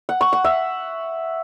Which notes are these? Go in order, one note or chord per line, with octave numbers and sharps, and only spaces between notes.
F#5
C#6
F#5
E5